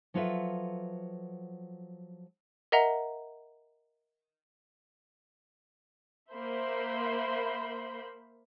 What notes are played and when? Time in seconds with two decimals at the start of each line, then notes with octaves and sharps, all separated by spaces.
0.14 F3 F#3 F4 A4 B4 E5
2.72 A#4 D#5 E5 F#5 A#5
6.34 A#3 C5 E5 B5 C6 G6